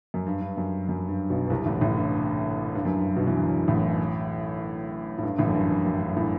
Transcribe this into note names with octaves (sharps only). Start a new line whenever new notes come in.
F#2
G2
G2
F#2
F#2
G2
B1 B2
B2
C2 C3
A1 A2
A1 A2
G2
G2
F#2
G2
B1 B2
E3
D2 D3
A1 A2
A2
G2
A1 A2
F#2
G2
F#2
F#2
G2
A2